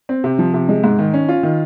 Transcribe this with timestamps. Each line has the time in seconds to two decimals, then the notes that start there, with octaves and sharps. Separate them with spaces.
0.09 C4
0.24 C3
0.39 F3
0.54 C3
0.69 G#3
0.84 G#2
0.99 D#3
1.14 C#4
1.29 F4
1.43 D#3